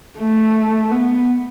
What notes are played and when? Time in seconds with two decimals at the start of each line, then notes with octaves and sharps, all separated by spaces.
0.18 A3
0.91 B3